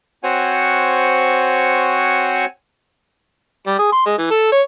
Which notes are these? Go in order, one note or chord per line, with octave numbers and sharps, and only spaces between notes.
C4 F#4 C5 C#5 F#5 G#5
G3
G#4
C6
G#3
E3
A4
C#5